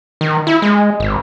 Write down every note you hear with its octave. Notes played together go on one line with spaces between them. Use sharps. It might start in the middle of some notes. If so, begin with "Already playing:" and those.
D#3
E4
G#3
G#1